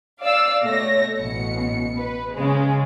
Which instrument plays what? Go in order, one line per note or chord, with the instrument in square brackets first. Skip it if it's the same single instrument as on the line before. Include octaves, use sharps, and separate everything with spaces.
[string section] D5 F5 E6
B2 A3 C#5 A#6
A1 B2 C#7
B4
C#3 G#3